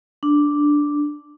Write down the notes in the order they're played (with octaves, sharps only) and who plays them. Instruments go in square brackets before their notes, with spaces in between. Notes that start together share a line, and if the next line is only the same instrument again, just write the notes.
[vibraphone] D4